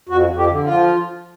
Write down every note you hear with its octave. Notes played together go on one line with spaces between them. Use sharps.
F2 F#4
F2
G4
D3
F4
F3